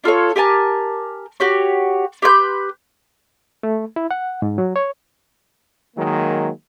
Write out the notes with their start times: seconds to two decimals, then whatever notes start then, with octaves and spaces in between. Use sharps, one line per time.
0.04 D4 F4 A4 C#5
0.36 G4 A#4 G#5 A5
1.40 F#4 G4 C#5
2.22 G4 B4 C6 G6
3.63 A3
3.96 E4
4.11 F#5
4.42 G#2
4.58 F#3
4.76 C#5
5.96 D#3 F#3 G#3 A#3